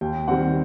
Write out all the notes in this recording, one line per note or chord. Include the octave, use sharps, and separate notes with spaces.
D#2 G5
D#3 G3 C4 F#5